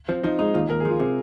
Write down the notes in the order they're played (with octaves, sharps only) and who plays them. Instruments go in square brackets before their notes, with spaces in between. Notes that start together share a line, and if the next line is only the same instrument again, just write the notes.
[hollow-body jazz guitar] F3 [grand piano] C4
[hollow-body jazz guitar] F3 [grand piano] D#4
[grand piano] G#3 [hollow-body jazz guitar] D#4
[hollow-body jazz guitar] D#2 [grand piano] F4
[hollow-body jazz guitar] D#2 [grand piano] A#4
[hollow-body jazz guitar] F3 [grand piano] G#4
[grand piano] F4
[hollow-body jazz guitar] C3 [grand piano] G#4